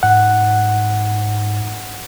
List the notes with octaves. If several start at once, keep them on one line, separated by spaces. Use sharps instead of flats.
G#2 F#5